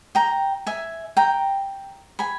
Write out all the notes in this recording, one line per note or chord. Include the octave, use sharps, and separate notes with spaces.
G5 A#5
E5 G#5
G5 A#5
G#5 B5